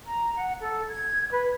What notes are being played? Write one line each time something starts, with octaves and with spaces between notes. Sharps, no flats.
A#5
F#5
A4
G#6
B4